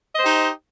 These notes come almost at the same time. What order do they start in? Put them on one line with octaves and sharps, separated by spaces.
D#5 C5 G4 D#4